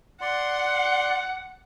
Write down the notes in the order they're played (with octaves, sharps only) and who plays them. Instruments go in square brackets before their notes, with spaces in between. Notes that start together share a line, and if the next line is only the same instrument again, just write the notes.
[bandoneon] D5 C6 [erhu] F#5